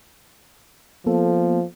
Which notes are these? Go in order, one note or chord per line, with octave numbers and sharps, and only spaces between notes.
F3 A#3 B3 A4